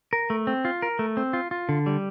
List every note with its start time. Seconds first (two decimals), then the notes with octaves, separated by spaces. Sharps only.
0.13 A#4
0.30 A3
0.47 C4
0.65 F4
0.82 A#4
0.99 A3
1.17 C4
1.33 F4
1.51 F4
1.69 D3
1.86 G3